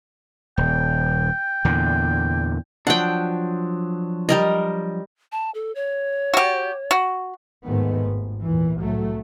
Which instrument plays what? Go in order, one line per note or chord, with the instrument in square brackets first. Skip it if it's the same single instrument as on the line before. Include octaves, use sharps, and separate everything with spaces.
[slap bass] D#1 [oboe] G5
[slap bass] E2 A#2 D3
[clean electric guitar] F3 F#3 D4 [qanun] F#5 G5
[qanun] G3 A#4 D#5
[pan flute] A5
A4
C#5
[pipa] F#4 G4
F#4
[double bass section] G1 D#2 G#2 D#3 A3 B3
G#1
E2 A#2 E3
C2 A2 F#3 A3